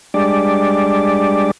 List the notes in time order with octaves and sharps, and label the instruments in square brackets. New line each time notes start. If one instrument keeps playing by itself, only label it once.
[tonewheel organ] G3 G#3 D4 D5